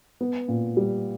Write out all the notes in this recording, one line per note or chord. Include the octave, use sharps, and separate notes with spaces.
B3
A#2
G3